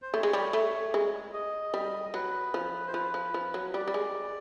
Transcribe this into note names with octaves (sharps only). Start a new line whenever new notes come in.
C5
A3 C#5
G#3
G3
A3
G#3
D#5
G3
F#3 B4
F3
C5
F3 B4
F3
F3
F#3
G3 D5
G3
G#3